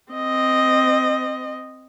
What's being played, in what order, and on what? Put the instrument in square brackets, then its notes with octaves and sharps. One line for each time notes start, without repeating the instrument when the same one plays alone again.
[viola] C4 D#5